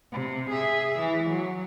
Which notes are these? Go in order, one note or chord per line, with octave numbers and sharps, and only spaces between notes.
C3
G#4 E5
E3
F#3